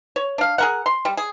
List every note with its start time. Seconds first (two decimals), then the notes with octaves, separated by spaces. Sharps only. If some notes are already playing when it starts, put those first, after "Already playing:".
0.16 C#5
0.38 D4 F5
0.58 G#4 A#4 F#5
0.86 C6
1.05 G3
1.17 G#4